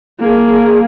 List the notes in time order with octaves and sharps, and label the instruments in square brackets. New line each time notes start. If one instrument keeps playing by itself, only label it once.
[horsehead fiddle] A#3 G#4